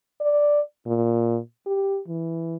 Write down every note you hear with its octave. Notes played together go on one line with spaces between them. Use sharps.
D5
A#2
G4
E3